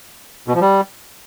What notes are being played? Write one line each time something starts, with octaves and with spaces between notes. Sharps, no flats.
B2
F3
G3